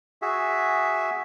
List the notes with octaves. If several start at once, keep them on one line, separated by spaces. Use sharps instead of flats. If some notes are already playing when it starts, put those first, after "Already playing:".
F#4 G#4 E5